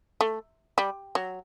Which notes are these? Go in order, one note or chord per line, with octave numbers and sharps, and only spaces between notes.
A3
G3
F#3